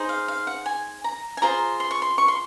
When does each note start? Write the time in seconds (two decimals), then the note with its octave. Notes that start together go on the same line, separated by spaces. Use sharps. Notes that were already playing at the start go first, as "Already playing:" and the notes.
Already playing: D#4 G#4 C5
0.09 F5
0.28 F5
0.47 F#5
0.66 G#5
1.04 A#5
1.37 G#5
1.42 F4 G#4 C5 A#5
1.80 C6
1.91 C#6
2.02 C6
2.18 C#6
2.28 C6